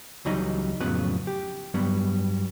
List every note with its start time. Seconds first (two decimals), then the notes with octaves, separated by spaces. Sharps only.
0.25 C#2 E3 F#3 G3 D#4 D#5
0.81 F2 A2 C#3 F#3 B3 B4
1.27 G4
1.74 G2 F#3 G3 B3